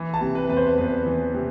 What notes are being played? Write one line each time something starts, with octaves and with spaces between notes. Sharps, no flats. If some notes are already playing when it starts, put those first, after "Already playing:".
Already playing: E3
A5
C3
B4
E2 B4
C5
E2 B4
E3
C3